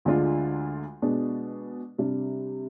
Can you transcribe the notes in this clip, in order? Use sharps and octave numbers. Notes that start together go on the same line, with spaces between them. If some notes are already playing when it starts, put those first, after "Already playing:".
D2 D3 G#3 D4 F4
B2 G#3 D4
C3 G3 D4